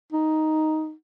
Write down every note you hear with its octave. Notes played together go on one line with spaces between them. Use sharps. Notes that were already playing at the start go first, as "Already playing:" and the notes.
D#4